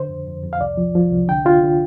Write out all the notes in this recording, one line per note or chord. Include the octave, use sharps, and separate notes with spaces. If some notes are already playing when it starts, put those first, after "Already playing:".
Already playing: D3 C5
F2
F2
F2
F5
C2 D5
F3
F3
C2
D3 G5
D3 F4
D3